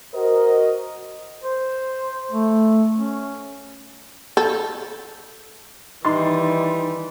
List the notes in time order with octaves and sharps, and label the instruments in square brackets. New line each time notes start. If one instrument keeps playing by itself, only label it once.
[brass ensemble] F#4 A#4 C5 D#5
[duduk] C5
A3
C#4
[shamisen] A4 [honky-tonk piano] G6
[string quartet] D#3 E3 G3 [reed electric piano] D#4 A6 [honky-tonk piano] C6